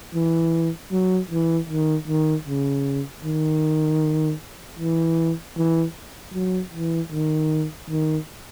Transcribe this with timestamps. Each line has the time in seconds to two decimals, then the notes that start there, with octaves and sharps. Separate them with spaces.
0.15 E3
0.92 F#3
1.31 E3
1.69 D#3
2.08 D#3
2.47 C#3
3.24 D#3
4.79 E3
5.58 E3
6.34 F#3
6.74 E3
7.12 D#3
7.90 D#3